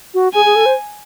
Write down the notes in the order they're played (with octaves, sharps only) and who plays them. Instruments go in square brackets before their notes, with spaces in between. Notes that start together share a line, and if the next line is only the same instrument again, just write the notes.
[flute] F#4
[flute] G#4 [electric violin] G#5
[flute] G#4
A4
C5